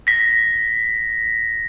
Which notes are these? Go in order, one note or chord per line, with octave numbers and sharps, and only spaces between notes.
A#6 B6